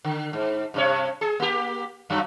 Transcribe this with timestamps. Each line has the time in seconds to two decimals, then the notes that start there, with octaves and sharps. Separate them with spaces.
0.05 D3
0.33 G#2
0.74 G2 C3 C#5
1.21 G#4
1.40 A#3 G4
2.10 F#2 F#3